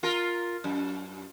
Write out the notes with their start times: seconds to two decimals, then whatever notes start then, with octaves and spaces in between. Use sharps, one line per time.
0.03 F4 A#4
0.64 F#2